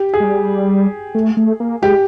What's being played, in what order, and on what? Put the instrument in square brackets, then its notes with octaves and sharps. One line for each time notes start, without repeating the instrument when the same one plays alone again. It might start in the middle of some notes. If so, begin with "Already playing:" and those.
Already playing: [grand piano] G4
G#4
[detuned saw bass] G#3
G3
A3
A3
A#3
[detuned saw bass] G#3 [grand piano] G4